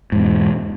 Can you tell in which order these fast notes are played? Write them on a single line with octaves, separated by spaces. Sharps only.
G#2 E2 B2